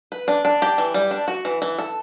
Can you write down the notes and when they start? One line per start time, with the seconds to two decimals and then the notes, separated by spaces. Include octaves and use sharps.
0.12 B4
0.28 D4
0.45 D4
0.62 G4
0.78 E3
0.94 G3
1.11 D4
1.28 F#4
1.45 E3
1.62 E3
1.78 A4